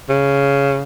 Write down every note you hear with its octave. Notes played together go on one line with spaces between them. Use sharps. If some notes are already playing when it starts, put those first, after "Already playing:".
C#3